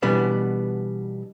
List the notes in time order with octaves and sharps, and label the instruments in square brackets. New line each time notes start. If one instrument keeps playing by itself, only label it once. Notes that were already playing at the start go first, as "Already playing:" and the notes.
[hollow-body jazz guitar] B2 E3 G3 B3 D4